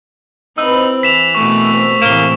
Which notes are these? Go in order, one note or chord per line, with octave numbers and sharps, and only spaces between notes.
C3 C4 D#4 E4 B4 E6
E3 B6 E7 F7
B2 A3 A#4 C#6
C4
A2 C3 E3 A#3 E7 G7